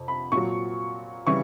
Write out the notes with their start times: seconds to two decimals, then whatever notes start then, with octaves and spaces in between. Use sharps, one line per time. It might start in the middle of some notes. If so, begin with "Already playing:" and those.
Already playing: F2 C3
0.08 B5
0.32 A#2 F#3 C#6
1.27 C#3 E3 G3 C#6